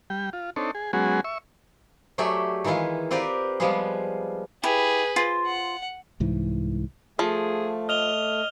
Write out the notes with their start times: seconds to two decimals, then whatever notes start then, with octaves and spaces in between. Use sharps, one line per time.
0.10 G3 G5
0.33 F4
0.56 C4 D4 D#4 A4 C#5
0.75 G#4
0.93 F#3 G#3 B3 C#4 F#4 G#4
1.24 E5 C#6
2.18 F#3 A3 G4 G#4 D5 E5
2.64 D#3 E3 G#3 E4 F4
3.11 C4 F4 G4 A#4 B4 D5
3.60 F3 G3 G#3 B3 F4 G#4
4.63 E4 G4 G#4 B4
5.16 F4 C5
5.46 F#5
6.20 C2 G#2 E3
7.19 F3 A3 G#4
7.89 D#5 F6 F7 G7